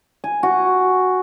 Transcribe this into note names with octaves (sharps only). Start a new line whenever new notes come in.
G#5
F#4